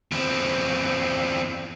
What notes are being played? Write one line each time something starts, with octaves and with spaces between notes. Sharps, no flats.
E2 C4